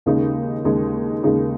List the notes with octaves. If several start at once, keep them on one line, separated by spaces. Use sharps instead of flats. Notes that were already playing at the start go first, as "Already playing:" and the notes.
D#2 C#3 G#3 D#4
D#2 C#3 G#3 D#4
D#2 C#3 G#3 D#4